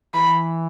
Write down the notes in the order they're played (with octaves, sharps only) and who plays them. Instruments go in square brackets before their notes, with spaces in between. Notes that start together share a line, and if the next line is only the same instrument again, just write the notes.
[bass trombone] E3 [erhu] B5